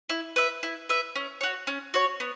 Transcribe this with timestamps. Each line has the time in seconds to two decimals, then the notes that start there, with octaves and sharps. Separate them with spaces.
0.09 E4
0.36 B4 E5
0.63 E4
0.89 B4 E5
1.16 C#4
1.41 F#4 C#5
1.67 C#4
1.94 F#4 C#5
2.20 B3